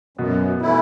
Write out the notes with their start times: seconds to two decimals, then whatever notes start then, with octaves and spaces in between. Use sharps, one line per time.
0.17 F#2 B2 B3
0.61 E3 A3 E4